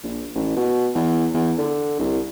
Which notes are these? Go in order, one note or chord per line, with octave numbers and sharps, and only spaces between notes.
A#1
A1
B2
E2
E2
D3
C2